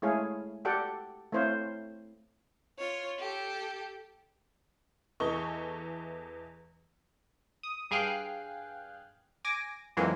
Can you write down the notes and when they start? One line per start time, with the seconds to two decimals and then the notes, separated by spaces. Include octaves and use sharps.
0.02 G#3 A3 E4 G#4 C#5 F5
0.65 F#4 G4 A4 D5 F#5 G5
1.32 A3 C4 E4 C5 C#5 F5
2.78 F4 C#5
3.18 G4 A4
5.20 E2 E3 A4 D#5 C#6
7.63 D#6
7.91 G2 G#4 F5 G5 F#6
9.45 G#5 D6 A#6
9.97 F2 G#2 E3 F#3 G#3 A#3